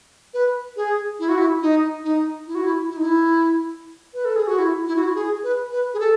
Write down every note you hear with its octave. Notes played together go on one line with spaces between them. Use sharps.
B4
G#4
E4
F#4
E4
D#4
D#4
E4
F#4
E4
E4
D#4
E4
B4
A4
G#4
F#4
E4
E4
F#4
E4
G#4
B4
B4
G#4
A4